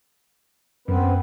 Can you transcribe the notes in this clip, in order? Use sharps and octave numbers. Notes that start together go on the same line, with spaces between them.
F#2 B3 C4 B4